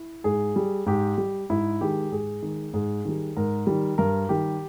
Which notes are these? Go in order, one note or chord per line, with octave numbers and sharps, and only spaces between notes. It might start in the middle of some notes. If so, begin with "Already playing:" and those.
Already playing: E4
G#2 G#4
G3
G#2 G4
G3
G#2 E4
D#3 G#3 G4
G#2 G#4
D#3 G#3
G#2 G#4
D#3 G3
G#2 A#4
D#3 G3
G2 A#4
D#3 G3 G4